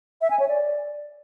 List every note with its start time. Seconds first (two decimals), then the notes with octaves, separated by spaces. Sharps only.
0.22 E5
0.31 G#5
0.40 C#5
0.49 D5